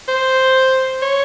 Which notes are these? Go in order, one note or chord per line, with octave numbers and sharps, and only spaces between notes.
C5
C#5